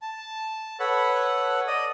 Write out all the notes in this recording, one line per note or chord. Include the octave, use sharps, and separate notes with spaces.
A5
A4 B4 C#5 F#5 B5
D5 D#5 D#6